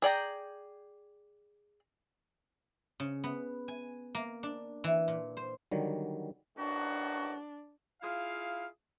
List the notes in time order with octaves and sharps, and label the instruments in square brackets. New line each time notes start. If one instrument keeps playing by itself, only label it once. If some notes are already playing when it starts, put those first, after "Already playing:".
[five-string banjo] G#4 D5 G5 A#5
[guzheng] C#3
B3
G#5
A#3
D4
E3
A#2
C5
[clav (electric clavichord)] D3 D#3 F#3 G3
[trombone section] A1 D#3 F#4 [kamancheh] D4
[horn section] E4 F4 G#4 F5